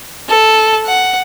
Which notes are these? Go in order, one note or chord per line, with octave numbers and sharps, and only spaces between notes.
A4
F#5